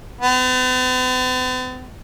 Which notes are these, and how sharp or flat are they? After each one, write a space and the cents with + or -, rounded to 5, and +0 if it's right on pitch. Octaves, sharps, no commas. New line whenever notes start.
B3 +45